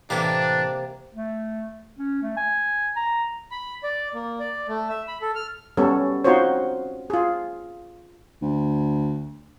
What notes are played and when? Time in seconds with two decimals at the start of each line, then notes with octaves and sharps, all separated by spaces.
0.10 A2 C3 E3 A#3 D4 G4
1.14 A3
1.98 C#4
2.22 A3
2.37 G#5
2.96 A#5
3.51 B5
3.83 D5
4.14 A#3
4.39 D5
4.68 A3
4.89 E5
5.08 B5
5.22 A4
5.35 F6
5.77 G3 B3 C#4 A4
6.25 C4 D#4 F4 F#4 C5 C#5
7.10 F4 G#4
8.42 D2